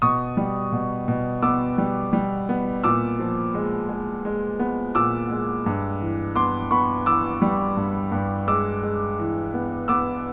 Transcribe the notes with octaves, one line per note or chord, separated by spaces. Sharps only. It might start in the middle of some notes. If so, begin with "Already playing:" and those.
B2 C#6 D#6
G3
B2
B2
B3 D6 E6
G3
G3
B3
A#2 D6 E6
F3
G#3
G#3
G#3
B3
A#2 D6 E6
G#3
G2
E3
B3 C6 D6
B3 B5 C#6
E3 D6 E6
G3
G2
G2
G#3 D6 E6
G#3
E3
B3
B3 D6 E6